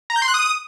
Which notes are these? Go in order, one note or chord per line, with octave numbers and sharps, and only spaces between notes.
A#5
G6
C6
F#6
D#6